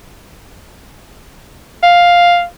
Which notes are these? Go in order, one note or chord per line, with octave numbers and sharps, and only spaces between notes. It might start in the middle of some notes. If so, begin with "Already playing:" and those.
F5